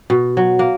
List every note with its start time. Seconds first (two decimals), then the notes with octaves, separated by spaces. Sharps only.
0.10 B2
0.37 F#3
0.59 A#3